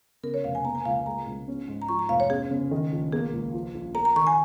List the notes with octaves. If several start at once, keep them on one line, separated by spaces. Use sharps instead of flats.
C#3 A#4
C#5
F1 F5
G#5
A#3 A#5
G#5
C#2 F5
G#5
G#3 A#5
C#2
C#4
G#2
A#5
F3 C#6
A#5
F1 F5
C#5
C#4 G#4
C#3
D#3
A#1
A#3 G#4
C#2
F3
A#1
A#4 A#5
A#5
D#3 C#6
G#5